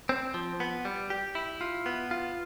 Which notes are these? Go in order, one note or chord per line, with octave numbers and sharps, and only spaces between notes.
C4
F3
B3
G3
G4
E4
F4
B3
F4